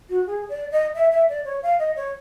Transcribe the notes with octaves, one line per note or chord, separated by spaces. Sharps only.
F#4
G#4
D5
D#5
E5
E5
D5
C#5
F5
D#5
C#5